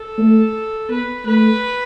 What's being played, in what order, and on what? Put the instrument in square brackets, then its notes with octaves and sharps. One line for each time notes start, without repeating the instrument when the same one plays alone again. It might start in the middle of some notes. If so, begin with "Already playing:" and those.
Already playing: [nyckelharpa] A4
[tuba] A3
[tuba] B3 [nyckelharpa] B4
[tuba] A3 [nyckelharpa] B4